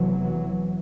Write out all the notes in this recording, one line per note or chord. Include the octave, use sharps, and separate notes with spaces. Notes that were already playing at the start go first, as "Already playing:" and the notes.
Already playing: F1 E2 C3 E3 F#3